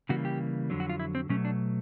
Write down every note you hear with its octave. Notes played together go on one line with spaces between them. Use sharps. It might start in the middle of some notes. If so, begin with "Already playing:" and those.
C#3 E3 G3 A#3 F#4
G4
F2 D3 F#3
F#4
F4
E4
C4
B2 F#3 A3 C#4
D4